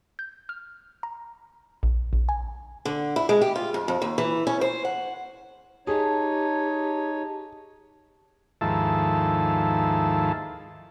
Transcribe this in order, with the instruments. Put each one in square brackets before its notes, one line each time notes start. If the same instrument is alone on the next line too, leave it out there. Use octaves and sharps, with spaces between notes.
[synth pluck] G6
F6
A#5
A#1
A#1
G#5
[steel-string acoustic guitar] D3
E4
G#3
G4
F4
F2
F2
D#2
E3
C#4
C5
F#5
[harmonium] D#4 C#5 [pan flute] G4 [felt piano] G#4 [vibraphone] A5
[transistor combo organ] D#2 G#2 F3 E4 A4 A5